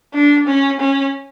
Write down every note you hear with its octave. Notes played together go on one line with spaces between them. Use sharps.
D4
C#4
C#4